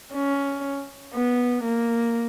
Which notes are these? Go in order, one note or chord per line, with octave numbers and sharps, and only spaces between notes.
C#4
B3
A#3